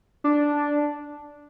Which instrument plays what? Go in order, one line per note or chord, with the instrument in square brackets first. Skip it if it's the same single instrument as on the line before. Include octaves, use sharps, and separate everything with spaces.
[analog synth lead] D4